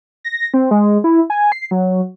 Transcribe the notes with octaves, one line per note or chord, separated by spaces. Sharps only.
A#6
C4
G#3
E4
G#5
C7
F#3